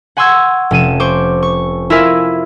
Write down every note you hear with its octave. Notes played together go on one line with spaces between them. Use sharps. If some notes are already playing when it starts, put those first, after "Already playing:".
F#5 G#5 C6 C#6 E6 G#6
F1 C#4 D#7 E7
C5 C#6 D6
C#6
E4 F4 A#4 E5 G#5